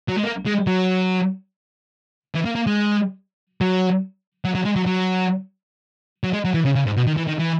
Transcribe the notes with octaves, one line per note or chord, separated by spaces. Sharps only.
F#3
G#3
A#3
G#3
F#3
E3
A#3
A#3
G#3
F#3
F#3
F#3
G#3
F#3
F#3
F#3
G#3
F#3
E3
C#3
C#3
G#2
B2
D#3
E3
D#3
E3